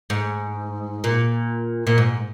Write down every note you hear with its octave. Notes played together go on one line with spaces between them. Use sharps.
G#2
A#2
A#2
G#2